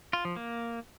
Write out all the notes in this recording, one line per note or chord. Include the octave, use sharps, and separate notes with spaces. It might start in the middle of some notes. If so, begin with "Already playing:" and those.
F4
F3
A#3